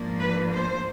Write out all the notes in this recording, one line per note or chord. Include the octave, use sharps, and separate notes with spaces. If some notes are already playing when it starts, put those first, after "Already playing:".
Already playing: G#2 F3 A#3 D4
B4
C5